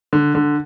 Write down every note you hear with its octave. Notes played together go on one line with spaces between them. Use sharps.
D3
D3